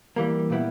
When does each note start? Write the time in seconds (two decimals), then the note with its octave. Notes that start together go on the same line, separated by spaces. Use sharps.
0.16 E3 G3 A#3
0.50 A#2 G3 B3 E4